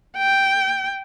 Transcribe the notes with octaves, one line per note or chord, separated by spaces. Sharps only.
G5